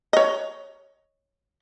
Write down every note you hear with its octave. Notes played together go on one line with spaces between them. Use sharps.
C#5 D#5